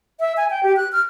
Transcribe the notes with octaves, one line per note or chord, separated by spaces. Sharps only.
E5
G#5
G5
G4
F#6
F6